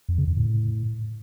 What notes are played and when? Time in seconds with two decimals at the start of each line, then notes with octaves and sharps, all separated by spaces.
0.09 F2
0.18 C#3
0.27 F2
0.37 A2